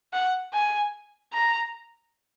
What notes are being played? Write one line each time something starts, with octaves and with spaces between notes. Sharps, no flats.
F#5
G#5
A#5